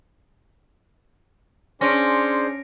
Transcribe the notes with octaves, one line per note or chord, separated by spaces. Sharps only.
C#4 D4 G#4 C5 C6 A#6 D7